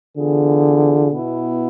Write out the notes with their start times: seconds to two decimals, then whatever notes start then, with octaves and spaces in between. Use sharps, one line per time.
0.17 D3 E3 B3 F4 G#4
1.11 B2 B3 E4